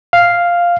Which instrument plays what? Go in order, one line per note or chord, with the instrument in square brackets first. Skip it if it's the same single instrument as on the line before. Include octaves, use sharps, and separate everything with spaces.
[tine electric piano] F5